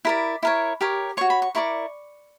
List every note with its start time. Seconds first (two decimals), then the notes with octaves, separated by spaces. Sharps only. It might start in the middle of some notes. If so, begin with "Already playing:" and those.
0.05 E4 A#4 D5 B5
0.43 E4 A#4 C#5
0.81 G4 A#4 C#5
1.17 F#4 C#5 C#6
1.30 B5
1.42 C#6
1.55 E4 A#4 D5 C#6